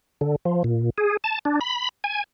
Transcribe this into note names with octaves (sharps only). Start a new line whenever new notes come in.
D3
F3
A#2
G#4
A5
D4
B5
G#5